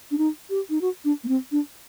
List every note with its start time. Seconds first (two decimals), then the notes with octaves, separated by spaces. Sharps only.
0.11 D4
0.18 D#4
0.50 G4
0.70 D#4
0.81 F#4
1.05 D4
1.24 A#3
1.28 C4
1.52 D4